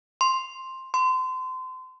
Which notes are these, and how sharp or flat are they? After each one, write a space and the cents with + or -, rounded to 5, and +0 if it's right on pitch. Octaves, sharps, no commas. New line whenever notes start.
C6 +5
C6 -30